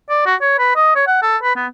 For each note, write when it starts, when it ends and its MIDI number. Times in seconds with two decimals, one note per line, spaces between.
0.09 0.24 74
0.26 0.35 66
0.41 0.58 73
0.59 0.71 71
0.76 0.91 75
0.95 1.03 73
1.07 1.18 78
1.22 1.37 69
1.43 1.55 71
1.56 1.67 59